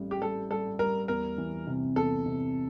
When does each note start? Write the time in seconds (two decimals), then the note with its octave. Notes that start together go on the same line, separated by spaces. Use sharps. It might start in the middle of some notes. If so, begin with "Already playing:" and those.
Already playing: A1 A2 G3
0.11 G4
0.21 G3 A4
0.50 G3 A4
0.79 G3 A#4
1.08 E2 A#4
1.38 E3
1.67 C3
1.96 E2 A4
2.26 C3